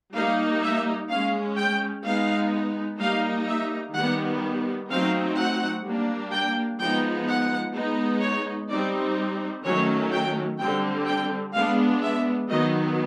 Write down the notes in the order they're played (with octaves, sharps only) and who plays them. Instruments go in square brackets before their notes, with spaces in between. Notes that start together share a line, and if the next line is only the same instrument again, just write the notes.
[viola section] G3 A#3 D#4 F5
E5
G#3 C#4 F5
G5
G#3 B3 D#4 F5
G3 A#3 D#4 F5
E5
D#3 G3 B3 F#5
F#3 A3 C4 D#4 F5
F#5
G3 A#3 D4
G5
F3 G#3 B3 D#4 G5
F#5
G#3 B3 D#4
C#5
G3 C4 D#4 D5
D#3 F#3 A3 C#4 C#5
G5
D3 G3 C4 G5
G5
G#3 B3 D4 F5
E5
D#3 F#3 B3 D#5